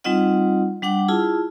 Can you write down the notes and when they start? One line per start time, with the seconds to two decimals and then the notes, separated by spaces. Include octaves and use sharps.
0.04 G3 C4 D#4 F4 D#5 F#5
0.82 G3 D4 F#5 G5 D6
1.08 E4 F4 G#4 A5